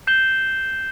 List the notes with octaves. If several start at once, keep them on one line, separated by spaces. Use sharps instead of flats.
G6 C7 E7 G7